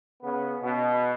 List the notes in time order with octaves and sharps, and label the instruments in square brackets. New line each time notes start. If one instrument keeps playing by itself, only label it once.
[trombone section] C#3 B3
B2